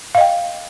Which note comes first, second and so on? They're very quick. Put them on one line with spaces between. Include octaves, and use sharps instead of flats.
F5 D#5 G5